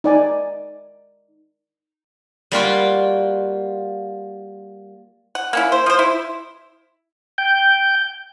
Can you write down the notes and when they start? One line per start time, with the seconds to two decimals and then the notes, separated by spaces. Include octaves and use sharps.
0.04 D#4 D5 G#5
2.52 G3 A#3 F4 F#4
5.35 F#5
5.53 A#3 C#4 E4
5.72 C5
5.86 F3 C5
5.99 E4
7.38 G5 G6